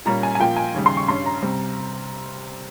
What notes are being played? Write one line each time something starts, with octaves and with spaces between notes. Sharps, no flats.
A#2 G3 A#3 C#4 A#5
G#5
G#5
A#2 F3 A#3 G5
G#5
D#2 C#3 G3
C6
C#6
G2 G3 C#4 C6
A#5
C3 G3 C4